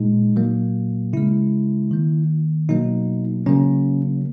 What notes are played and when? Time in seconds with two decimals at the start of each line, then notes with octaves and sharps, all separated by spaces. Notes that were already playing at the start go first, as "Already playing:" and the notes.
Already playing: A#2 G#3 D#4
0.36 A#2 F#3 A#3
1.13 C#3 G#3 E4
1.91 D#3 A#3
2.69 B2 F#3 A#3 D#4
3.46 C#3 F#3 A#3 C#4